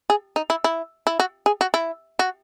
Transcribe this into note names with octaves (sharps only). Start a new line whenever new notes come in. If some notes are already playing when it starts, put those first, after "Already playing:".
G#4
D#4
E4
E4
E4
F#4
G#4
F#4
E4
F#4